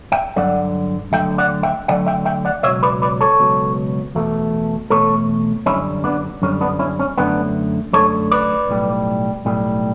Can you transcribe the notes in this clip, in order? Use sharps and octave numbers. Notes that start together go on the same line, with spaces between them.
E5 G5
G2 D3 F#3 D5 F#5
D2 D3 F#3 E5 G5
D5 F#5
E5 G5
D2 D3 F#3 D5 F#5
E5 G5
E5 G5
D5 F#5
C#2 B2 F#3 C#5 E5
B4 D5
B4 D5
A4 C#5
C#2 B2 F#3
E2 B2 A3
E2 B2 A3 A4 C#5
F#2 D3 G3 C#4 E4
B3 D4
F#2 D3 G3 C#4
B3 D4
C#4 E4
C#4
F#2 D3 A3 B3 D4
F#2 D3 A3 A4 C#5
B4 D5
B1 A2 G3
B1 A2 G3